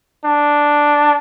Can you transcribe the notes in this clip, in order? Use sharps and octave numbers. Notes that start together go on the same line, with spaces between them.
D4